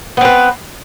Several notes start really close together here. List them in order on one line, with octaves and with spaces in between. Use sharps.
B3 C4 B4